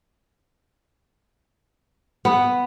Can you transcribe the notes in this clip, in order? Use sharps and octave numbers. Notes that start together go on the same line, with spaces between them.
B3